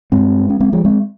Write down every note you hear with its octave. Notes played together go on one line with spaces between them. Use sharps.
G2 G#3 C4
C#4
G#3 C4
F3 G#3
G#3 C4